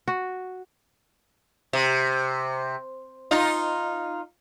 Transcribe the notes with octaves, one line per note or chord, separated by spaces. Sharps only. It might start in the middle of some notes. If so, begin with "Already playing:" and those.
F#4
C3
D#4 F4